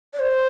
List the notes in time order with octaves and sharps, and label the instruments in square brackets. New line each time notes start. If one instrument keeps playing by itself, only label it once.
[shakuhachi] D5
C5